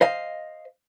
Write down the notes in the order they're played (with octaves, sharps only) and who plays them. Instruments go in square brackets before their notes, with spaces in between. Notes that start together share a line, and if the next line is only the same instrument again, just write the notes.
[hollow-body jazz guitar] C5 D#5 F5